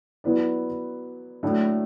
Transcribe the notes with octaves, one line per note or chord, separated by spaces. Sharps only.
F#3 B3 E4 B4 D5
A2 F#3 A3 D4